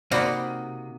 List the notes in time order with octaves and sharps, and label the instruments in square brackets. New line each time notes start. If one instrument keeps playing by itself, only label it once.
[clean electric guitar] C3 [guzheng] A#3 D#4 F#4 [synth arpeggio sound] C5 D5 B5